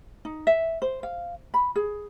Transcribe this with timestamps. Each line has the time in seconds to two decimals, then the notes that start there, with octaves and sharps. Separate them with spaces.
0.25 D#4
0.47 E5
0.82 C5
1.03 F5
1.54 B5
1.76 G#4